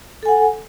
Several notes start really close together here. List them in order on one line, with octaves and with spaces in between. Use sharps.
A4 G#5 F#5